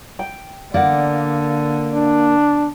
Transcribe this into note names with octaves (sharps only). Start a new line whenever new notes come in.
G5
D3 A#3 D5 F#5
D4